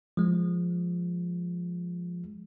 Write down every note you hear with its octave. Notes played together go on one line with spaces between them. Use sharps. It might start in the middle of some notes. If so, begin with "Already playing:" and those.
F3 G#3